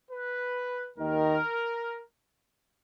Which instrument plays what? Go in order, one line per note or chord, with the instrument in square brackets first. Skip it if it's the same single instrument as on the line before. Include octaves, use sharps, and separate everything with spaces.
[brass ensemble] B4
D#2 D#3 A#4